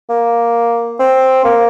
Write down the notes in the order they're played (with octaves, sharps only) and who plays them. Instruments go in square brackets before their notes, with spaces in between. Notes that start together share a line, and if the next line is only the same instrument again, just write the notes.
[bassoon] A#3
C4
A#3